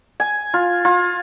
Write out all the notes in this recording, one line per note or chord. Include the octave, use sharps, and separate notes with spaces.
G#5
F4
F4